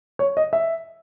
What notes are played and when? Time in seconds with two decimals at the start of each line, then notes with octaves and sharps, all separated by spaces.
0.19 C#5
0.37 D#5
0.53 E5